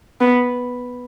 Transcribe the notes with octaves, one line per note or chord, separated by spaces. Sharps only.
B3